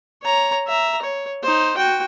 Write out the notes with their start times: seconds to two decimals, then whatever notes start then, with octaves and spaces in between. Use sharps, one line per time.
0.22 C#5 A#5
0.67 E5 A#5
1.02 C#5
1.43 D#4 C5
1.77 F#4 G5